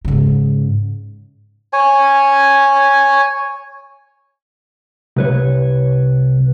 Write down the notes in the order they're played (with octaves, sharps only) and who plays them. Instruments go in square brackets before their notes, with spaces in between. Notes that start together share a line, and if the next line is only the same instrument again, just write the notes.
[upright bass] G#2 C#3
[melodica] C#5 G#5
[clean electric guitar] C2 B4 C#5